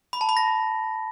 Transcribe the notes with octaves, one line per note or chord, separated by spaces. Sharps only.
B5
A5
B5
A#6